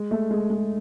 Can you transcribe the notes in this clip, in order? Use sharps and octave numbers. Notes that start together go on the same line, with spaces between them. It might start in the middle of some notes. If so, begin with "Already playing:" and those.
Already playing: G#3
A3
G#3
G#3